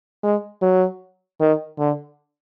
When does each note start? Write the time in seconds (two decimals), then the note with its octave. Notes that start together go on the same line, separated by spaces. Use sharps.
0.23 G#3
0.62 F#3
1.40 D#3
1.79 D3